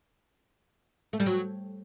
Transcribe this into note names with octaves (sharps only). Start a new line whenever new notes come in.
A3
G3
F#3